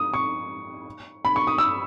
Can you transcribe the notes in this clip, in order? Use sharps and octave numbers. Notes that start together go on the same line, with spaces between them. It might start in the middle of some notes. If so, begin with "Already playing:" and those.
Already playing: D#6
C#6
B5
C#6
D#6
E6